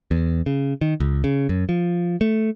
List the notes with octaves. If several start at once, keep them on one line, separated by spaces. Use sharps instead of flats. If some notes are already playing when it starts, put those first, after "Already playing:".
E2
C#3
D#3
C#2
C#3
F#2
F3
A3